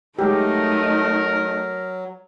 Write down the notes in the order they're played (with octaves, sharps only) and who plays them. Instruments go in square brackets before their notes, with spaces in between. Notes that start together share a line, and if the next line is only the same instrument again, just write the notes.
[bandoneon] F#3 [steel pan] G#3 G4 [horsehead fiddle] A3 D#4 [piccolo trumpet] A#4